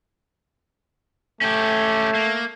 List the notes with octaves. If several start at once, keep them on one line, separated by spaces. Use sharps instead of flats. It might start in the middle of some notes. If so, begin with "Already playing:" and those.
A3 C#4 G4
A#3